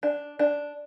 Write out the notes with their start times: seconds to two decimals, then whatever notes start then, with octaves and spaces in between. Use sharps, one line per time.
0.03 D4
0.39 D4